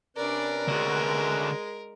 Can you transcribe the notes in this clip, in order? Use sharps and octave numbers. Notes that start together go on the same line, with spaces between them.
C3 C#4 D4 A#4 B4 D5
D3 G#3 F#4